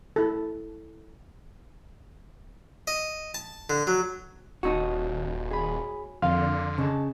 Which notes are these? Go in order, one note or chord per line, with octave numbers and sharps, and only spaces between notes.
E4 A4
D#5
A5
D3
F#3
D#1 D#4 F#4 C#5 A5
G#4 C#5 G#5 B5
F2 D3 A#4 D5 F5 C6 F6
C#3 D#4 A5